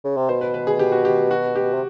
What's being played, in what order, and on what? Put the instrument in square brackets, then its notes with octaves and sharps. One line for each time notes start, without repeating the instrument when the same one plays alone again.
[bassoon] C#3
C3
[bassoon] B2 [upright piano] C5
[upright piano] B4
B4
G#4
G4
F#4
G4
F#4
G4
[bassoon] C3